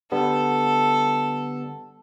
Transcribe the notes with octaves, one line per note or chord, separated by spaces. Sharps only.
D3 G3 B3 A4